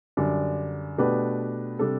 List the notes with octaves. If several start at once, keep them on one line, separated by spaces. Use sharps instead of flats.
F#2 D3 G3 D4
B2 A3 D4 G4 B4
C3 G3 D4 A4